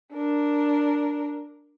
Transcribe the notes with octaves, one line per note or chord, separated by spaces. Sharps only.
D4 A#4